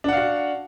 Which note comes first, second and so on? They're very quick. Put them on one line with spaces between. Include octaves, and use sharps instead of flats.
D4 F#5 F5 F#4